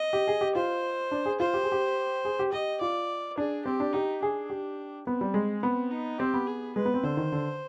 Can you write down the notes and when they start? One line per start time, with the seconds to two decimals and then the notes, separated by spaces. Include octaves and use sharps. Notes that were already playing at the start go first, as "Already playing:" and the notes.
Already playing: D#5
0.13 G4
0.28 G#4
0.41 G4
0.55 F4 C5
1.11 D4
1.26 G#4
1.40 F4 C5
1.54 G4
1.64 G#4
1.72 G4
2.25 G#4
2.39 G4
2.52 G4 D#5
2.81 F4 D5
3.38 D4 G#4
3.65 C4 G4
3.80 D4
3.93 D#4 G4
4.23 D4 G#4
4.50 G4
5.07 B3 C4
5.21 G3
5.34 G#3
5.63 B3 C4
5.91 D#4
6.19 C4 G4
6.34 B3
6.47 G#4
6.76 G#3 B4
6.85 B3
6.94 C4
7.03 D3 C5
7.17 D#3
7.32 D3